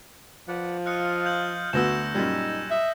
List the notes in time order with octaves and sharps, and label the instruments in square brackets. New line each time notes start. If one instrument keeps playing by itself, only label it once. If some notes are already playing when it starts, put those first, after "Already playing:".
[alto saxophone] F3 [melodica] B4 D5 F#5
[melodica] F4 D#5 F5 [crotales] F6 F#6 C#7
[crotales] F6 G6 F#7
[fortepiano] D2 B3 F#4 [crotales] E6 A#6 E7
[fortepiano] F#2 A#2 G3 [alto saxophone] D#4 [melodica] G#5
[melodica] D#5 [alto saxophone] E5